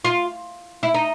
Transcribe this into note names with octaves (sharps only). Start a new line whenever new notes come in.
F4
E4
D#4